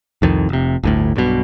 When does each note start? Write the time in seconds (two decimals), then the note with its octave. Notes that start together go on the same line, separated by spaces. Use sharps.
0.22 C2 F2 D#3
0.49 F1 C3
0.83 G1 D2 A2
1.16 B1 G2 B2